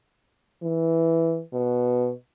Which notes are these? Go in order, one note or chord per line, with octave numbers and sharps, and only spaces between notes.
E3
B2